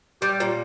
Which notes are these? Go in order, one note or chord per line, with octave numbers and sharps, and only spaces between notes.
G3 G4
A#2